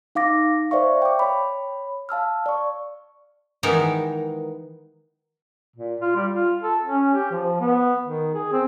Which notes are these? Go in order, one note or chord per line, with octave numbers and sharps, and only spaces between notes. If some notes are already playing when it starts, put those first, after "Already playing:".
D#4 F5 D6 A#6
C5 D5 E5 F5 C#6
G5 D6
C#5 B5
F5 A5 E6 F6
D5 C#6
D#3 E3 G#3 B3 D#4 A#4
A#2
F4
G3
F4
A4
C#4
G4
F3
B3
D#3
G#4
C4